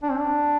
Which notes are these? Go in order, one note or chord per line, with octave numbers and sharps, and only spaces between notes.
D4
C4
D4